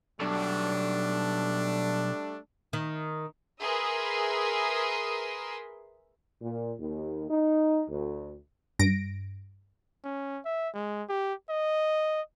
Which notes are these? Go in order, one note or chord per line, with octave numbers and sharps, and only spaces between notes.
B1 G3 A3 D4
D#3
G#4 A#4 B4 E5 C6 D#6
A#2
D#2
D#4
D2
G2 A#6 D7
C#4
E5
G#3
G4
D#5